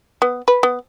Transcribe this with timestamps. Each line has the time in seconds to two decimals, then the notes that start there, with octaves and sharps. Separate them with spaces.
0.22 B3
0.48 B4
0.63 B3